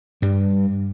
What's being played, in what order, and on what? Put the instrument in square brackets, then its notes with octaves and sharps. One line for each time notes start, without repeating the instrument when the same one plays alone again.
[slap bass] G2 G3